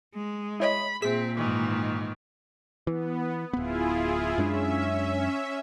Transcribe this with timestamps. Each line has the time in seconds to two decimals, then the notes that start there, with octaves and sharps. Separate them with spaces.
0.14 G#3
0.60 E4 C#5 D#5 B5
1.02 A#2 C4 G#4 E5 B6
1.37 G#2 D#3 E3
2.87 E3 B3
3.53 D1 B3 E4 F4 G#4
4.38 F#2 G#3 C#4 D4 E5